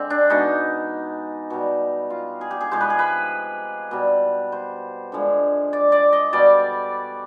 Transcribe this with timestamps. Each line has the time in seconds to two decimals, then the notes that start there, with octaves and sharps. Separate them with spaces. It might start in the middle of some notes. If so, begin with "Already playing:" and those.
Already playing: D3 G#3 C4
0.10 D4
0.30 B2 G#3 D#4
1.50 B2 G3
2.10 F4
2.41 G#4
2.51 G4
2.61 G#4
2.71 C3 F3 G#3 C5
2.81 B4
2.90 G#4
2.99 B4
3.91 B2 G3
4.52 C5
5.12 D3 F3 G#3
5.73 D5
5.92 D5
6.13 D#5
6.33 B2 G3 D5